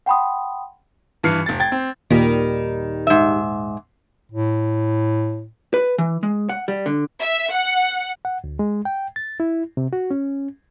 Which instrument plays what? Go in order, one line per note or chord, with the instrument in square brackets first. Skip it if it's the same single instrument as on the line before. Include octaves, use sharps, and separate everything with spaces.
[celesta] F#5 G5 A5 B5 C6 D#6
[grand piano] G2 E3 F6 C7 C#7
F1 A6
G5 G#6 A6
C4
[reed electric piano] D#2 A#2 [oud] D#3 G3
[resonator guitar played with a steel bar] G#2 E5
[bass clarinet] A2
[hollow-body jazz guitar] B4
E3
G#3
F#5
G3
D3
[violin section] E5
F#5
[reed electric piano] F#5
D2
G#3
G5
A6
E4
C3
F#4
C#4